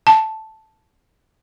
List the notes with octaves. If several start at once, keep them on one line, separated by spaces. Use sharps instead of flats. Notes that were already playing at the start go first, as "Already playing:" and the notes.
A5